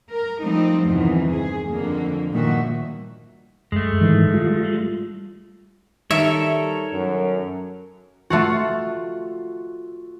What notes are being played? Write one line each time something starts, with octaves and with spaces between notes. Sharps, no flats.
A#4
F3 G3 A3 C4 D#4
E2 G2 C3 D#3 E3
G#4
F2 D3 A#3
G2 A#2 D#3 F3 F#4 E5
F#2 G#3 A3
G#2 D#3 E3
G3 F4
D#3 G3 A4 A#4 C#5 E5
F#2
A3 F4 F#4